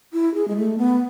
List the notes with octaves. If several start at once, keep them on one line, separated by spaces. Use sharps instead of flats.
E4
G#4
G#3
A3
B3